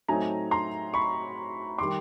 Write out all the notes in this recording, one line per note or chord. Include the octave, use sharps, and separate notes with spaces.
A2 F#3 A3 C4 D#4 G#5 A#5
A#5 C6
B5 C#6
D#3 G3 C6 D6